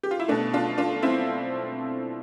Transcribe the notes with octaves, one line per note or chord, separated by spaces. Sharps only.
G4
F4
E4
B2 A3 D4
D4 F4
D4 F4
C4 E4